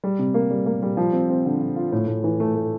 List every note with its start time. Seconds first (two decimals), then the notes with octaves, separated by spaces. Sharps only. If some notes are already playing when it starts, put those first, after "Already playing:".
0.04 G3
0.19 C3
0.34 A#3
0.51 G3
0.66 A#3
0.82 G3
0.97 F3
1.13 C4
1.30 C4
1.46 D3
1.61 D3
1.76 F4
1.92 A2
2.07 A2
2.24 E3
2.40 A3
2.55 A3